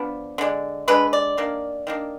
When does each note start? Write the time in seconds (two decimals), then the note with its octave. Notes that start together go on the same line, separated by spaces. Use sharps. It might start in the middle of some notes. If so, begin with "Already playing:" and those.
Already playing: F3 B3 D4
0.38 D3 G#3 D4
0.88 D3 G#3 D4 B4
1.13 D5
1.37 D#3 A#3 D4
1.87 D#3 A#3 D4